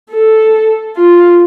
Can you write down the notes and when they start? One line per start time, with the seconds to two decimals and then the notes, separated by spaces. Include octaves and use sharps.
0.11 A4
0.96 F4